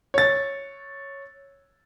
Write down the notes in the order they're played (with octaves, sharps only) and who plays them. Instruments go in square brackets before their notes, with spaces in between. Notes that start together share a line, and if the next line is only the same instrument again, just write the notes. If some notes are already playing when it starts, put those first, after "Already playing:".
[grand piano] C#5 A6